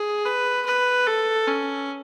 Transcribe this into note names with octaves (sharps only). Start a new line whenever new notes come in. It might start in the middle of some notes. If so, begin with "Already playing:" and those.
Already playing: G#4
B4
B4
A4
C#4